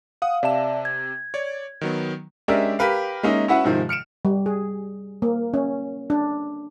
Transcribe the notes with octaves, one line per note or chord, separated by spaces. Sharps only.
F5 F#5 D#6
C3 D5 E5 A5 E7
G#6
C#5 D5
D#3 F#3 B3
G#3 C#4 D4 G4 A#4 E5
G4 A#4 B4 F5
G#3 A#3 C#4 D#4 E5
C#4 E4 F#4 B4 E5 F#5
G#2 C3 D#3 F3
F6 C#7 D7 E7
G3
G#4
A#3
C#4
D4